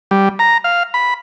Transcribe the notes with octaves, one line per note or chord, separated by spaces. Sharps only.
G3
A#5
F5
B5